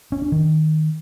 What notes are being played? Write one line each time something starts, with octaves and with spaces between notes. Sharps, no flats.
C#4
D4
D#3